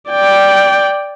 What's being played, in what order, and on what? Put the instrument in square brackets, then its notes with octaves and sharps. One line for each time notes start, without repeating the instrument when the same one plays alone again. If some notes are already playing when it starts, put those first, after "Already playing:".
[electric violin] D5 G5